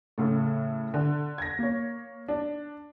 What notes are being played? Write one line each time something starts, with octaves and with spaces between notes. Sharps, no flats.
A2 C#3 A3
D3
G#6 A#6
A#3 C#5
D4